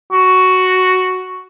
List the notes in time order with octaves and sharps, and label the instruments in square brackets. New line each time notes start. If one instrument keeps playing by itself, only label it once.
[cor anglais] F#4